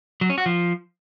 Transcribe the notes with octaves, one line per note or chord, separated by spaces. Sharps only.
F#3
C#4
F#4
F3